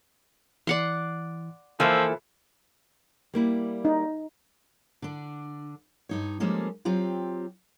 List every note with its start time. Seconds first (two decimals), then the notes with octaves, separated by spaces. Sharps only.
0.67 E3 D5 F#5 C6
1.80 E3 F3 A#3 F4 A4 C5 E5
3.34 G3 A#3 E4
3.85 D#4
5.02 D3 D4
6.09 G2 D#4 C#5
6.40 F3 G3 G#3 A#3 C#4 A4
6.85 F#3 C4 F4 G4